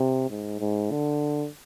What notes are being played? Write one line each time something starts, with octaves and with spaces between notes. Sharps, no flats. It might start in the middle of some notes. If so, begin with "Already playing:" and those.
Already playing: C3
G#2
G#2
D3